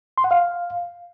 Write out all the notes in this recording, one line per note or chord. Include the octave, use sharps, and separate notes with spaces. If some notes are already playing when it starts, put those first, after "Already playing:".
C6
F#5
F5